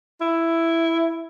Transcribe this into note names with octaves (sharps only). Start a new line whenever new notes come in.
E4